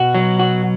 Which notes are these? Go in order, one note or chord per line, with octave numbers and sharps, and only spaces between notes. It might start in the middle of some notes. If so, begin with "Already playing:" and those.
Already playing: B2 F#4
F#3
F#4